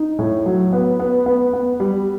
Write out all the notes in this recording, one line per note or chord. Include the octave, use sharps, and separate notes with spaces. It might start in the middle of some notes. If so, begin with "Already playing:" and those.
Already playing: D#4
A2
F#3
B3
B3
B3
B3
G3